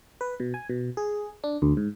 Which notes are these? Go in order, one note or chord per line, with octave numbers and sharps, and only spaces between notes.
B4
B2
G#5
B2
G#4
D4
D2
G#2